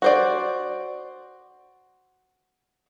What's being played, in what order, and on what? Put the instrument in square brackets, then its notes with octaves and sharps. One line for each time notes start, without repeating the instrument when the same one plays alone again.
[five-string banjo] F#4 C5 D5